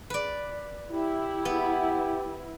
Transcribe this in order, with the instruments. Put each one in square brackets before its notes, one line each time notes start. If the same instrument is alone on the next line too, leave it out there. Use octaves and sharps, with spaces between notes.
[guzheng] B4 D5
[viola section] E4 [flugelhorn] G4
[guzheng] B3